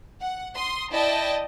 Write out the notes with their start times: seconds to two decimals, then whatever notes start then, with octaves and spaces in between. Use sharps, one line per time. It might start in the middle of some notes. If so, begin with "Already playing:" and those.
0.21 F#5
0.55 C6 D#6
0.91 E4 D5 D#5 G5 A5